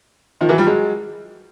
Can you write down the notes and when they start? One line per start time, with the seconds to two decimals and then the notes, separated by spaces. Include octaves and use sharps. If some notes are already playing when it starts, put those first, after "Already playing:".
0.41 D#3 F3
0.49 E3 F#3
0.58 F3 G3
0.67 F#3 G#3